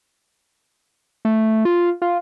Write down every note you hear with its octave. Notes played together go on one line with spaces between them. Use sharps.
A3
F4
F4